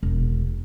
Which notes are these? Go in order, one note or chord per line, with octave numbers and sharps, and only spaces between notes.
E1